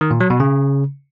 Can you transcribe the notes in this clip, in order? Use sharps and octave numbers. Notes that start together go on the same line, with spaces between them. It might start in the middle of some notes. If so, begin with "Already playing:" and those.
D#3
A#2
F#3
B2
C#3